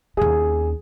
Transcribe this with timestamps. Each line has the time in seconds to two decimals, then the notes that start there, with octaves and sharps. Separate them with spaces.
0.17 D#2 C#4 G#4